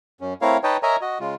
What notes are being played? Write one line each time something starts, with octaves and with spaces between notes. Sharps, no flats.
F#2 C#4
A3 C4 E4 A#4 C#5 F5
D#4 B4 C#5 D#5 G5 A5
A#4 C#5 D#5 E5 G#5 A#5
F#4 D#5
C#3 G#3 F4